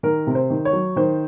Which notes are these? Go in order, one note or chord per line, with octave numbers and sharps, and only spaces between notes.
D#3 A#4
C3
C5
D#3
C#5
F#3
D#3 C5